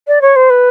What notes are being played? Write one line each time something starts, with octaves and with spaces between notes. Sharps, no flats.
D5
C#5
C5
B4